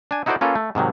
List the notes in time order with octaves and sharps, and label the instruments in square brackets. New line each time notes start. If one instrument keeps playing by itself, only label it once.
[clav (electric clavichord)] D4 G#5
D#4 E4 F#4 A4 C5 D5
A#3 C#4 F4 A4 B4
A3
G#2 C3 D#3 F#3